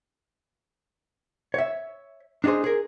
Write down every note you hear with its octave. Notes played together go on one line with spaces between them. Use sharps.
C#5 E5
D4 D#4 F#4 G#4 C5
G#4 A#4